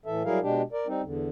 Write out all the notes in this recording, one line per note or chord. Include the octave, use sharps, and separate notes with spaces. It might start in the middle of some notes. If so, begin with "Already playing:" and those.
A2 E3 A4 E5
F#3 G3 E4 G#4 A#4 F5
B2 G#3 D4 G4
A#4 D5
G3 C4 D#4
E2 D3